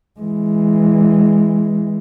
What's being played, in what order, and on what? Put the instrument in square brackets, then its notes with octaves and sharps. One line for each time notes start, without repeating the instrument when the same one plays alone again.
[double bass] E3 G#3